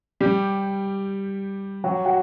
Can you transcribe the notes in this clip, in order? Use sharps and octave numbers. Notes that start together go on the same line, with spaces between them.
G3 G4
F#3 F#4
F#4